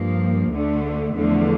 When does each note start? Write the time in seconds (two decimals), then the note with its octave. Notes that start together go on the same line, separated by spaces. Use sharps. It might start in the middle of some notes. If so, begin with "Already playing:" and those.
Already playing: G2 F3 A#3
0.50 D2 D3 A3
1.13 E2 D3 F3 A3